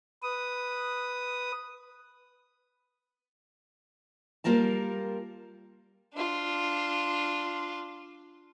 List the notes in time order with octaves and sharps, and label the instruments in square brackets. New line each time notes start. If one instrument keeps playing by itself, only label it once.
[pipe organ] B4 D#6
[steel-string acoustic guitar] G3 A#3 F4 A#4 A5
[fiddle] D4 F4